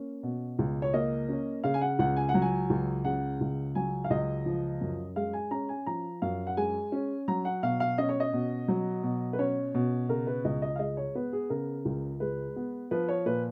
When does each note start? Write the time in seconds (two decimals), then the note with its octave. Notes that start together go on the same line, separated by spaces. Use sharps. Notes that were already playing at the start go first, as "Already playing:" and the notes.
Already playing: A#3 C#4
0.23 B2
0.59 C#2
0.82 C#5
0.94 A#3 D#5
1.29 C#4
1.64 C#3 F5
1.74 G#5
1.81 F#5
1.99 C#2 F#5
2.17 G#5
2.29 F#5
2.34 F#3
2.42 G#5
2.70 C#2
3.05 C#3 F#5
3.41 C#2
3.75 F#3 G#5
4.04 F5
4.10 C#2 D#5
4.46 F3
4.81 F#2
5.16 G#3 F5
5.33 G#5
5.51 C#4 A#5
5.69 G#5
5.86 F3 A#5
6.22 F#2 F5
6.47 F#5
6.57 G#3 G#5
6.92 C#4
7.28 F#3 A#5
7.45 F#5
7.63 B2 F5
7.80 F5
7.98 C#4 D#5
8.09 C#5
8.20 D#5
8.33 B2
8.68 F#3
9.03 B2
9.33 B4
9.39 C#4 C#5
9.74 B2
10.09 C#3 A#4
10.27 B4
10.45 C#2 D#5
10.62 D#5
10.76 F5
10.79 G#3 D#5
10.97 C#5
11.15 B3 B4
11.33 G#4
11.50 C#3 A#4
11.85 C#2
12.20 G#3 B4
12.56 B3
12.91 F3 B4
13.09 C#5
13.26 A#2 B4